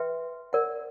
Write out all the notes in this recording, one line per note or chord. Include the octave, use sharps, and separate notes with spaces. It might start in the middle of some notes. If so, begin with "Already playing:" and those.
Already playing: B4 E5 G5 C6
A#4 D5 F#5